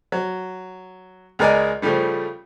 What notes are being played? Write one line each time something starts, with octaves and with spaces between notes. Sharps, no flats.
F#3
C#2 G#3 A#4 D5 D#5 G#5
C#3 F3 G3 A3